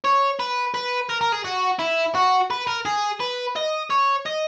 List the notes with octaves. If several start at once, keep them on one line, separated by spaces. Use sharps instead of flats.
C#5
B4
B4
A#4
A#4
G#4
F#4
E4
F#4
B4
A#4
G#4
B4
D#5
C#5
D#5